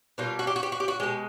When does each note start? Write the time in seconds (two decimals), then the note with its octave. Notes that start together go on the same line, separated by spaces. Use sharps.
0.18 B2 G3 A#3 F4
0.39 F#4
0.47 G4
0.56 F#4
0.63 G4
0.72 F#4
0.80 G4
0.88 F#4
1.00 B2 G#3 G4